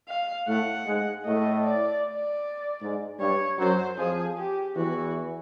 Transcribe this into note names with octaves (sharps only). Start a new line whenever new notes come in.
F5
A2 A3 F#5
G#2 G#3
A2 A3 D#5
D5
D5
G#2 G#3
G2 G3 C#5
F#2 F#3 C5
F2 F3 G#4
G4
E2 E3 F#4